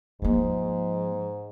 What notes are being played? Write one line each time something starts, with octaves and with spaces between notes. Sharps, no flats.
G#2 F3 A#3